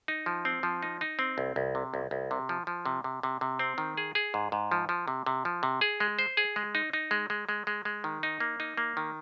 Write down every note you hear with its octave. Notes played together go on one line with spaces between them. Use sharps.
D#4
F3
C4
F3
D#4
D#4
C4
C2
C2
C3
C2
C2
C3
F3
F3
C3
C3
C3
C3
C4
D#3
G#4
G#4
G#2
G#2
F3
F3
C3
C3
F3
C3
G#4
G#3
C5
G#4
G#3
D#4
D#4
G#3
G#3
G#3
G#3
G#3
D#3
D#4
A#3
D#4
A#3
D#3